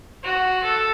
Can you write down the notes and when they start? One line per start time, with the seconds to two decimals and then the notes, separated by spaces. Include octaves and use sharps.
0.23 F#4
0.63 A4